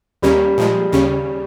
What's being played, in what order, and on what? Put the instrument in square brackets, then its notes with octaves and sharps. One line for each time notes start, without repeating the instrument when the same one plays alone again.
[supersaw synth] D#2 D#3 A#3 C#4 [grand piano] G3
[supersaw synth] A#2 F3 G#3
D#2 C#3 G3 C#4